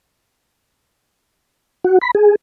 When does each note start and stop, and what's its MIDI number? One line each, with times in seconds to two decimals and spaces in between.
1.84 1.98 66
2.02 2.11 83
2.15 2.35 68